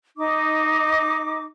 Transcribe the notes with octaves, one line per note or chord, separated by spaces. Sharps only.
D#4 D6